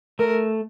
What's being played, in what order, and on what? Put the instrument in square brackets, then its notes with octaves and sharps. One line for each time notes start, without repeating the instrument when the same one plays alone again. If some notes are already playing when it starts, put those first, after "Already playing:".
[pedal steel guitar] A3 [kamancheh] A#4